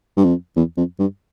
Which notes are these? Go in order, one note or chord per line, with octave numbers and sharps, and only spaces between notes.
G2
F2
E2
F2
G2